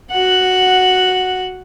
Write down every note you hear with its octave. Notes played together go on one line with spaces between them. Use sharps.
F#4 F#5